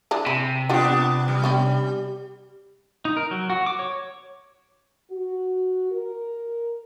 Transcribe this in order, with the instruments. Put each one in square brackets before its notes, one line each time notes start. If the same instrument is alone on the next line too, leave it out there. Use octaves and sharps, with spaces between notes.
[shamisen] E3 D4 G#4
[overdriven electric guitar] C3 [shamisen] B5
[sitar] B3 D4 [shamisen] F4 G4 F#5
[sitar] G3
[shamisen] B3 C#4 G4
[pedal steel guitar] D#4
A#4
F#3
F#4
D6
C#5
[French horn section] F#4
A#4